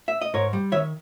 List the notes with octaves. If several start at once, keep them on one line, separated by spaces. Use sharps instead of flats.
E5
D#5
G#2 A#4 C#5
G3
D#3 C#5 E5